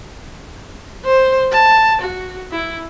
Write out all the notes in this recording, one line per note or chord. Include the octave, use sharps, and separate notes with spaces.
C5
A5
F#4
E4